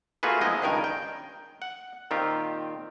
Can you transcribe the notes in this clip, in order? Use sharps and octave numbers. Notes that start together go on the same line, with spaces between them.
A3 A#3 F4 F#4 G#4 B4
F3 G#3 B3 D#4 E4 D#5
C#2 G2 D#3 A#4 G5 G#5
G5
F#5
A#2 D#3 C4 F4 G4